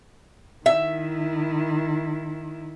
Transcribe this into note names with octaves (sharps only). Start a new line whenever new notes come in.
D#3 E4 E5